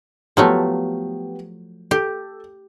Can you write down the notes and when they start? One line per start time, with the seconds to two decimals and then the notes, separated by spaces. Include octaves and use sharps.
0.37 F3 F#3 A3 B3 G4
1.91 G4 A4